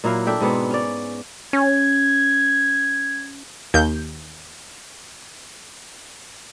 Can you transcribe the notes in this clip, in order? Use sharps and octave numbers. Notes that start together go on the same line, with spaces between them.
A#2 F#3 E4 F5
D4 A4 E5 G5
G#2 B2 B3 C4
C#4 D5
C#4 G#6
D#2 G6